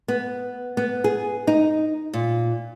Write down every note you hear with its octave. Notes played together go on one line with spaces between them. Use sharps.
B3
B3
G#4
D#4
A#2